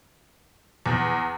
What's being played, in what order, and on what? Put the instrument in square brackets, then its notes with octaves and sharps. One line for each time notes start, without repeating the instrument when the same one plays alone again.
[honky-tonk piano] E2